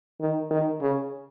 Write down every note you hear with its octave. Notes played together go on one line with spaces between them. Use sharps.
D#3
D#3
C#3